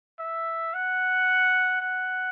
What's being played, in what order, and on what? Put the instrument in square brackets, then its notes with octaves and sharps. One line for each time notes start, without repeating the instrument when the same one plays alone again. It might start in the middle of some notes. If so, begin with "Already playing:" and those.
[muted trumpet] E5
F#5
F#5